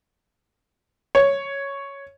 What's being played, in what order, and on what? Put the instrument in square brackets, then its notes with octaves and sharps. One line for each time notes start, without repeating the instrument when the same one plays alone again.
[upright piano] C#5